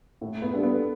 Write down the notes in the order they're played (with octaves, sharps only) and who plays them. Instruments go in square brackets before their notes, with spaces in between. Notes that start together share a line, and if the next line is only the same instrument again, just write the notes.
[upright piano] A2
[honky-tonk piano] B3
[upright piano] G3 D4 A4
[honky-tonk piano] B3